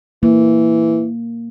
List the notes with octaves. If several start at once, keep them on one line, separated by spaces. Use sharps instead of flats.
E3 A#3